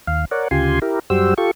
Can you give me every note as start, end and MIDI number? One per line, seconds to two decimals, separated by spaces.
0.07 0.25 39
0.07 0.25 77
0.31 0.48 70
0.31 0.48 73
0.31 0.48 74
0.31 0.48 78
0.51 0.79 38
0.51 0.79 49
0.51 0.79 65
0.51 0.79 67
0.51 0.79 80
0.51 0.79 84
0.82 0.99 64
0.82 0.99 67
0.82 0.99 70
1.10 1.34 42
1.10 1.34 55
1.10 1.34 66
1.10 1.34 67
1.10 1.34 72
1.10 1.34 88
1.38 1.51 65
1.38 1.51 67
1.38 1.51 69
1.38 1.51 85